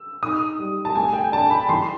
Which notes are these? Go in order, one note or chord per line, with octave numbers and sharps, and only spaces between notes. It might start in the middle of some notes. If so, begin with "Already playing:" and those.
Already playing: E6
D#4 D#6
G3
A5
A3 G#5
G5
D4 A5
B5
E3 C6